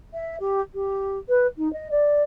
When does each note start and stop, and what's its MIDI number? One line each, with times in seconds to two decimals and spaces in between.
0.13 0.36 76
0.40 0.60 67
0.74 1.18 67
1.28 1.46 71
1.58 1.71 63
1.73 1.88 75
1.91 2.22 74